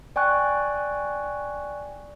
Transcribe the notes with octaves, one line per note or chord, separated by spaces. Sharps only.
D5 G5 G#5 C#6 F#6